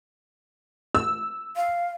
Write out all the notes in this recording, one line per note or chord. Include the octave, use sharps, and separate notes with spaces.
E6
F5